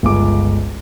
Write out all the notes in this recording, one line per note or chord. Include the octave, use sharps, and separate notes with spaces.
G1 C#2 D6